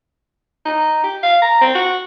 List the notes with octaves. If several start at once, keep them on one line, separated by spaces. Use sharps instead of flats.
D#4
G4
F5
A#5
C4
F#4